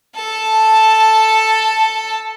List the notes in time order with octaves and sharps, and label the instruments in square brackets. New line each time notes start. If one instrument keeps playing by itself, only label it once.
[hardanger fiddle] A4 A5